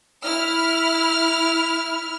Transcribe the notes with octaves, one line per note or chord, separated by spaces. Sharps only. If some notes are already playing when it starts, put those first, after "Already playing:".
E4 F6